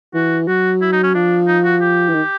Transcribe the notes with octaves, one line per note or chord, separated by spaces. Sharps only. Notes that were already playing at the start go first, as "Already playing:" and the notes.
E3 F#4
F#3 F#4
E4
D#4
C#4
F3 D4
D#4
F#4
G4
E3
D#3